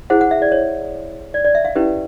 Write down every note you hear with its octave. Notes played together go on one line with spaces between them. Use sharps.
E4 G#4 C5 F#5
F#5
E5
D5
C#5
D5
D5
E5
F5
C#4 E4 G4 B4